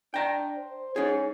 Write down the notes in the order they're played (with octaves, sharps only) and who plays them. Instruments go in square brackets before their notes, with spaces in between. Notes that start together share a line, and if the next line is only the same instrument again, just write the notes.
[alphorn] D4 [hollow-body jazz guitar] G5 A#5
[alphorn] C5
[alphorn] C#4 [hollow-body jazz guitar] D#4 G#4